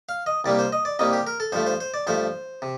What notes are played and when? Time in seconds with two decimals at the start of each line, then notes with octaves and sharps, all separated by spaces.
0.09 F5
0.26 D#5
0.44 C2 C3 G3 A#3 D5
0.59 C5
0.72 D#5
0.85 D5
0.99 C2 C3 G3 A#3 D#5
1.13 G4
1.27 A#4
1.40 A4
1.52 G2 F3 A3 C5
1.66 C5
1.80 C5
1.94 D5
2.07 G2 F3 A3 C5
2.62 C3